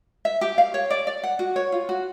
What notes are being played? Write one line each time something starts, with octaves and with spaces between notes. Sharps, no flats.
E5
G4
F5
C#5
D5
D5
F#5
F#4
C#5
F4
F#4